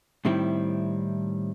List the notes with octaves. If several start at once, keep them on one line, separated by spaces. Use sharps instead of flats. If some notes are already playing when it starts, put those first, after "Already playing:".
A2 D#3 G3 C4 E4